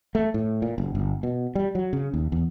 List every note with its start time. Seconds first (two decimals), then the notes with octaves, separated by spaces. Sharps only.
0.15 A3
0.34 A2
0.62 A#2
0.78 F#1
0.95 G1
1.23 B2
1.55 G3
1.75 F#3
1.93 C#3
2.14 D#2
2.32 E2